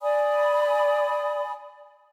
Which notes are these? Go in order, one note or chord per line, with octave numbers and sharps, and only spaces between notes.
D5 G#5 B5 D#6